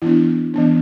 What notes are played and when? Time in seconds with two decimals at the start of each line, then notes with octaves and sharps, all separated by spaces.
0.02 E3 B3 D4 E4
0.54 E3 B3 D4